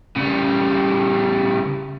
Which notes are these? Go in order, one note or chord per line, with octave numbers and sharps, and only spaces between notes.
C#3 G3